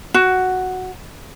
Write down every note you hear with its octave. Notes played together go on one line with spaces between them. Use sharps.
F#4